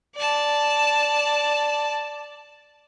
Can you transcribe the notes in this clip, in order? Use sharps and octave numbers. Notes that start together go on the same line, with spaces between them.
D5 A5